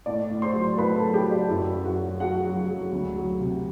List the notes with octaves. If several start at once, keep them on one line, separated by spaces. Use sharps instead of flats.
A2 D5
A2
C5 C6
F#3
A2 B4 B5
A4 A5
F#3
G4 G5
F#3
D5
F#2 E4 E5
F#3
F#4 F#5
F#3
F#3 F#4 F#5
F#3
F#3
D2
F#3
C3